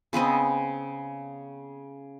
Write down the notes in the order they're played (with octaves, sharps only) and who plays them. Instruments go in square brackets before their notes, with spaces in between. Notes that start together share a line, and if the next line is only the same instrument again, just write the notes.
[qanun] C#3 B3 C4 D#5